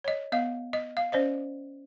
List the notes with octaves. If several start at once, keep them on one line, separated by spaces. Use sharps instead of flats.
C#5 D#5
B3 D#5 F5
D#5
F5
C#4 C5 D5 D#5